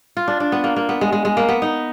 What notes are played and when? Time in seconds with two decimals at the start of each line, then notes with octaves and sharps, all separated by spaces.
0.17 F4
0.28 D4
0.40 D4
0.52 B3
0.64 A#3
0.76 A#3
0.89 B3
1.01 G#3
1.12 G#3
1.25 G#3
1.37 A#3
1.49 B3
1.62 D#4